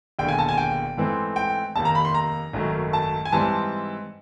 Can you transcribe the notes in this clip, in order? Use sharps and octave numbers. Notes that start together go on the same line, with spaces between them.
E1 D#2 D3 G5
G#5
A5
G#5
G5
G#2 E3 A3 C4
G5
F1 D#2 D#3 A5
A#5
B5
C6
A#5
G#1 F#2 D#3 F#3 A3
A5
G#5
G#2 E3 G3 C4 A5